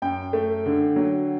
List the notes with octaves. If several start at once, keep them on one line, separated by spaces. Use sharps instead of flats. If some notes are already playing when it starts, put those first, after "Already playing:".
F#2 G5
A3
D3
F#3